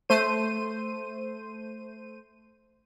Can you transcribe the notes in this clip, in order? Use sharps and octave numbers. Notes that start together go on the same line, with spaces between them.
A3 C5 D#7